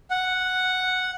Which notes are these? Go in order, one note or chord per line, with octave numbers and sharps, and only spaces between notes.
F#5